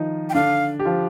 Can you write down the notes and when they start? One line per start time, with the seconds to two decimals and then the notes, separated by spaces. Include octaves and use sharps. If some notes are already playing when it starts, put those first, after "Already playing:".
Already playing: D#3 F3 D#4 F4
0.30 G5
0.34 D3 D4 F5
0.79 G4
0.85 F3 F4